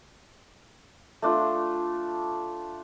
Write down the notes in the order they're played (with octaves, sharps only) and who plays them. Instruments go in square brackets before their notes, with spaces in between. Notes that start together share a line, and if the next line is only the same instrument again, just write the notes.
[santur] A3 D4 F4